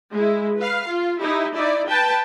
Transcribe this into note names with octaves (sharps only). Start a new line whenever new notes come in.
G#3 E4
B4 F5
F4
D#4 E4 G4
D#4 E4 D5
B4 G5 A5